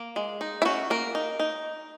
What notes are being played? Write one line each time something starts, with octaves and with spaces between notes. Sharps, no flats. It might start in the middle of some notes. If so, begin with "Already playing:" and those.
Already playing: A#3
G#3
D#4
E4
C#4 F#4
A#3 A#4
D#4
D#4